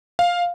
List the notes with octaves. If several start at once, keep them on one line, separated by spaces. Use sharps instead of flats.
F5